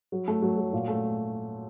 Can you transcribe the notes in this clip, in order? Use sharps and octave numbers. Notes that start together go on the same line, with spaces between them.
F#3
A3
F#3
F#3
A#2
A3